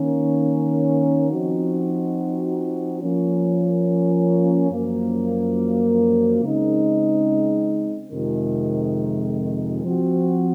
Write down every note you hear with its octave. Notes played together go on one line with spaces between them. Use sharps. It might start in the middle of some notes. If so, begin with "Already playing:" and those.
Already playing: D#3 A#3 C#4
F3 C4 D#4 F#4
F3 A#3 C#4
F#2 F3 A#3
C#3 G#3 C4 D#4
F2 C3 D#3 G#3
F3 C4 F#4